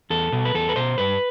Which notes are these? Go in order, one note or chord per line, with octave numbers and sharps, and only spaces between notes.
E2 A4
B2
B4
E2 A4
B4
B2 C5
G2 B4